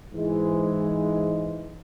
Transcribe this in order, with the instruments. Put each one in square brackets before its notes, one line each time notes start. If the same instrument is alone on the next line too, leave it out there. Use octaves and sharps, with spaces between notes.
[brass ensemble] G#2 E3 G#3